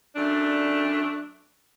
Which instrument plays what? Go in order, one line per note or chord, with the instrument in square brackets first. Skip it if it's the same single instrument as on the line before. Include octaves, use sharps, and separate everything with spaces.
[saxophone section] F#2 A3 D4